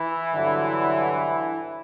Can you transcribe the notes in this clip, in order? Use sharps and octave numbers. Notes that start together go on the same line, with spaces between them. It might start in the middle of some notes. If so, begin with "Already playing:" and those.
Already playing: E3 E4
G2 D3 F#3